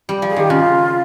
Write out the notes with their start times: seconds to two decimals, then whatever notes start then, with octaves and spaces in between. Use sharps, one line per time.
0.09 G3
0.22 F3
0.30 G#4
0.36 D#3 G4
0.50 C#3 F4